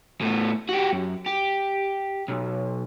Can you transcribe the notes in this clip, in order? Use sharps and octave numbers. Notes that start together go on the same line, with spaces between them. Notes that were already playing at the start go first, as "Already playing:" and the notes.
A2 B3
F#4 G4
F#2
G4
B1